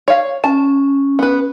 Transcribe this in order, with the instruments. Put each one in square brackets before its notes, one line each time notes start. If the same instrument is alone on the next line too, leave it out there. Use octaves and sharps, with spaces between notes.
[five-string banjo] C#5 F5
[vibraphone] C#4 [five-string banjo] A5
[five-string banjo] B3 B4